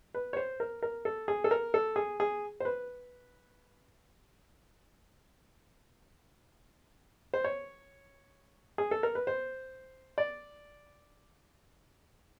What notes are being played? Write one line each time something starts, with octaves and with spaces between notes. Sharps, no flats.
B4
C#5
C5
A#4
A#4
A4
G#4
A4
A#4
A4
G#4
G#4
C5
B4
C5
C#5
G#4
A4
A#4
B4
C5
D5